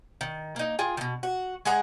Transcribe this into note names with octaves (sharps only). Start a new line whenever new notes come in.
D#3
A#3 D#4
F4 G#4 G5
B2 D#3
F#4
G#3 G#4 F#5 A#5